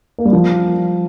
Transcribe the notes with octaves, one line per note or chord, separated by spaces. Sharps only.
A#3
G3
F3